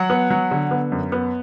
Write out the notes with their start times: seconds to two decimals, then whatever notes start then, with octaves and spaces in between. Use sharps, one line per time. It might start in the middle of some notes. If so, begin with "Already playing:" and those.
Already playing: F#3 F#5
0.10 B3
0.30 F#3
0.51 D3
0.71 B3
0.92 F#2
1.12 B3